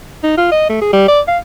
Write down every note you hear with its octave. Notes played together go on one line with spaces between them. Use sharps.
D#4
F4
D#5
A3
G#4
G3
D5
F5